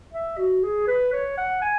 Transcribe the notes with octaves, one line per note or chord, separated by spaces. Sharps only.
E5
F#4
G#4
B4
C#5
F#5
G#5